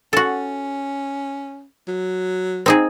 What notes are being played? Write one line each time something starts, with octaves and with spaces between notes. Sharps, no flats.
C#4 F#4 A4
F#3
C4 D#4 G#4